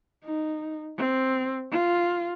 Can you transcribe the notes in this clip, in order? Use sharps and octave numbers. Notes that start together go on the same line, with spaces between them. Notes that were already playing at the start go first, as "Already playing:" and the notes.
D#4
C4
F4